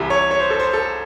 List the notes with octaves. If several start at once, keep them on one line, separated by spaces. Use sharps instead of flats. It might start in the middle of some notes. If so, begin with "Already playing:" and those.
Already playing: C2 C3 E3
C#5
C#5
C5
A4
C5
A4